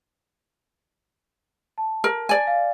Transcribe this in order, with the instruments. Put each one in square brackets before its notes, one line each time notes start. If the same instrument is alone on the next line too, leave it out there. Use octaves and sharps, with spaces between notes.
[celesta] A5
[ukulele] A#4
D5 G#5
[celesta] F5